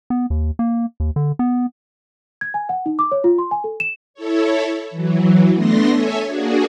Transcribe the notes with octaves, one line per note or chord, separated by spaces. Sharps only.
B3
D#2
A#3
D#2
D3
B3
G#6
G#5
F#5
D#4
D6
C#5
F4
C6
G#5
A4
E7
E4 A4 C#5
E3 F#3
A3 B3 D4 C6 A#6
A4 C#5 E5 G#5
A#3 D4 F#4 G#4